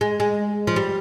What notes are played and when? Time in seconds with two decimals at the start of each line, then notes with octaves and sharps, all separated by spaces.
0.01 G#3
0.20 G#3
0.67 F3
0.76 G3